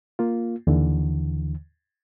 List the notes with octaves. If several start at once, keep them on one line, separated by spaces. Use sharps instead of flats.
A#3 F4
D#2 D3 E3